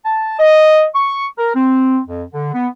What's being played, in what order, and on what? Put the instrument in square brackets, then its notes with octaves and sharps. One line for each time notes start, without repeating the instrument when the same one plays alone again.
[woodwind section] A5
D#5
C#6
A#4
C4
F2
D3
B3